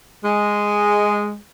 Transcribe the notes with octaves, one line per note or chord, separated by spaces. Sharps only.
G#3